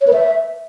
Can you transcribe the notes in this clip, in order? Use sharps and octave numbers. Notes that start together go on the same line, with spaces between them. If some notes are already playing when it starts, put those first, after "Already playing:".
C#5
B4
E5